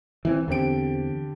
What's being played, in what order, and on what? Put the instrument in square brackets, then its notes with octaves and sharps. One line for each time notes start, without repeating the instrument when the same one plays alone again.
[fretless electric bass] E3 B3 C4
[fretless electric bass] E2 C4 [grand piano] D3 G4 D7